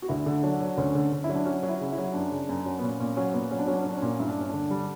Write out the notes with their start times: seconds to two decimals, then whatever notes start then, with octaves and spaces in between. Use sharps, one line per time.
0.02 F#4
0.09 D2 E4
0.26 D3
0.43 F#3 D4
0.60 F#3
0.78 D2 C#4
0.95 D3
1.12 D3
1.24 E4
1.29 F#3
1.35 D4
1.45 F#3 C#4
1.63 F#3
1.69 E4
1.80 C#3
1.92 E4
1.98 F#3
2.14 F#2 D4
2.31 C#3
2.49 F#2
2.66 F#3
2.79 B3
2.82 A#2 C#4
3.00 A#2 C#4
3.16 F#3 C#4
3.33 A#2 B3
3.51 F#3 C#4
3.59 D4
3.67 F#3 C#4
3.74 D4
3.81 C#4
3.86 F#3 D4
3.97 C#4
4.02 A#2
4.20 G2 E4
4.29 D4
4.37 G2 C#4
4.49 D3 D4
4.70 G3